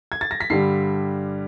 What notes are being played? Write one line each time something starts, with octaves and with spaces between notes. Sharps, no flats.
G#6
A6
A#6
B6
G2 D3 G3 C7